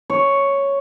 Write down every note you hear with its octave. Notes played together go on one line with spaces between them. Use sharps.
C#5